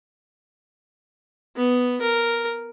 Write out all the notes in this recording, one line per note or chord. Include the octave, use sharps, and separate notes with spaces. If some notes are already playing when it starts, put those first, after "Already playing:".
B3
A#4